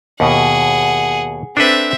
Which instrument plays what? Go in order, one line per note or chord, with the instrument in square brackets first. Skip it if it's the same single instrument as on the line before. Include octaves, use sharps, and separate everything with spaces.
[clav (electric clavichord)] D#2 B2 [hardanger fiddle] G#4 F#5
[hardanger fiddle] C4 E5 [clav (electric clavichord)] D4 A4 B4